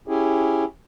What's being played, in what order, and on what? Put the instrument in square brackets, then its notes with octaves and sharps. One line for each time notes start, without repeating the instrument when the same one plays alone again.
[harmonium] C#4 E4 G4 G#4